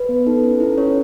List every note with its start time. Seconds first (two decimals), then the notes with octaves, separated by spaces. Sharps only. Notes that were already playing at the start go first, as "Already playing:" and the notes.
Already playing: B4
0.09 B3
0.27 D#4 A4
0.43 C#4
0.60 E4 A4
0.78 C#4 C#5